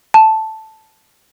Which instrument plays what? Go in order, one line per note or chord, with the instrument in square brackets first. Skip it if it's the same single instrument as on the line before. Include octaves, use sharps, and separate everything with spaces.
[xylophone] A5